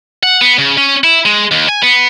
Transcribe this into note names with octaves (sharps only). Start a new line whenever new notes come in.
F#5
B3
C#3
C#4
E4
G#3
D#2
G#5
B3